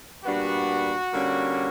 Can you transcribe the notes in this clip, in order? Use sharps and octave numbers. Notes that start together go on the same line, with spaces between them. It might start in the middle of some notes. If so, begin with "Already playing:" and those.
A#2 G3 B3 D4 F#4
D3 G3 A#3 C#4